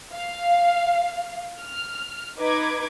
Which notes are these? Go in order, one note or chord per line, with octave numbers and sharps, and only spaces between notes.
F5
F6
D#4 B4 D6 G#6